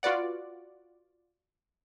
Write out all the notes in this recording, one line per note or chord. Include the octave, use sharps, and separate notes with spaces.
F4 F#4 B4 D5 F#5